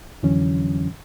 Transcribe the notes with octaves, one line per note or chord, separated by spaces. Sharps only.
F2 D3 E3 F#3 C#4